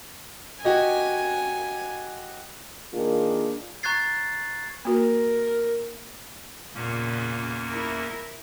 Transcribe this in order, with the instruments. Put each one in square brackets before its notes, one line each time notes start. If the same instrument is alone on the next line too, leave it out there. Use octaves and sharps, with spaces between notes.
[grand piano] F#4 G4 D#5 [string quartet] G#5
[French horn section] D#3 A#3 D4 F4 G#4
[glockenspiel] A#5 C#6 F#6 G#6 A6 C7
[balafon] A#3 F#4 [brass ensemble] A#4
[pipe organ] E2 A#3 C#4 [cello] A#2 C#3
[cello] E4 A#4